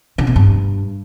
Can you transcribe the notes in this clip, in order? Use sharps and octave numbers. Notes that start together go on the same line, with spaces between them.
C#3
B2
G2